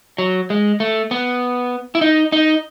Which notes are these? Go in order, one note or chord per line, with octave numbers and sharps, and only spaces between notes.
F#3
G#3
A3
B3
E4
D#4
D#4